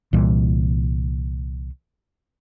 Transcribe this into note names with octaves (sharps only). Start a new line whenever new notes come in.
C2 A#2 E3 G3